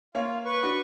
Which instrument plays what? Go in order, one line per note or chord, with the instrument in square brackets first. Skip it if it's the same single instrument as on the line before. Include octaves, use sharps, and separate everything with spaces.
[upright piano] A#3 C#5 F5 [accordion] F4
[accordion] B4 C#6
[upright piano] D4 F#4